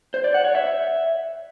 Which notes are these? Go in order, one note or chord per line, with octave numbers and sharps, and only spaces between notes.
C5
D5
F#5
C#5
E5